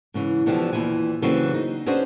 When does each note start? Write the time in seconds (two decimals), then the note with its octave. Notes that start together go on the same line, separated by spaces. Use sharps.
0.14 G#2 C#3 E3
0.46 B2 D3 E3 F3 G4
0.73 D#2 A#2 E3 E4 G#5
1.22 C#3 E3 F#3 G3 A#3 C4
1.54 D#4
1.86 C#4 D4 F#4 G#4 B4 C5